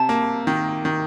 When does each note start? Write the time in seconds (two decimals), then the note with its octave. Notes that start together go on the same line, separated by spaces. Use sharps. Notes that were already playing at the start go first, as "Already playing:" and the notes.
Already playing: C3 A5
0.09 A#3
0.47 D#3
0.85 D#3